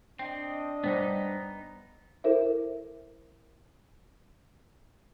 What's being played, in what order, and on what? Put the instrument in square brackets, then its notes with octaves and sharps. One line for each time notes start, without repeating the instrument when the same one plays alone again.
[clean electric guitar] C4 [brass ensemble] D4 D#5 [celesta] G5
[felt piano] G2 [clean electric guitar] B3 D#4 [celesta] C5 G5 B6
[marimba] E4 A4 A#4 C5 E5